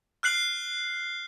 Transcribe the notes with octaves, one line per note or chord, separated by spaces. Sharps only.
F6 F#6 C7 F#7